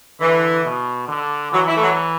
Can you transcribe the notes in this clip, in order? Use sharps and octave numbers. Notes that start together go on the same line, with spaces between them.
D3 E3
B2
D3
E3 F#3
E4
A3
F#3